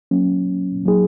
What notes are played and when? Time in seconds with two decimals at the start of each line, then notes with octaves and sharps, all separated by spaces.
0.11 F#3 A#3 C#4
0.85 F#3 A#3 D#4 G#4